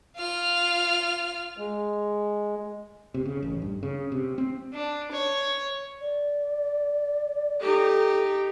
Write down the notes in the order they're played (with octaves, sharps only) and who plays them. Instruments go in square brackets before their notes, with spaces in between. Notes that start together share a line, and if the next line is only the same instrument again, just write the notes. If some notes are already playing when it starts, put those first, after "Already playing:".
[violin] F4 F6
[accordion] G#3
[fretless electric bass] C3
C#3
A1
G2
C#3
C3
C4
[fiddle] D4
C#5
[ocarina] D5
[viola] D#4 G4 [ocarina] A4